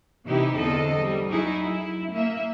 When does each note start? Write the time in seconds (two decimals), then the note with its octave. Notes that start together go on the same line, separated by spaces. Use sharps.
0.27 C3 E3 D#4 E4 G4
0.58 E2 D3 C4 A4 D#5
1.01 G3
1.30 F#3 D#4 E4 G#4
1.63 E4
2.13 A#3 E5